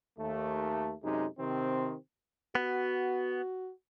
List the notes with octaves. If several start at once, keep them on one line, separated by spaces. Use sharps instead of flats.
D#2 A3
F#2 C3 G#3 D#4
C3 D#3 C4
B3 F#4